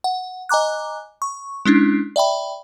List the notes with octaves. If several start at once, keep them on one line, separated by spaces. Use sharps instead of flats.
F#5
D#5 G#5 A#5 D6 F#6
C#6
G#3 C#4 D4 E4
D5 E5 G5 B5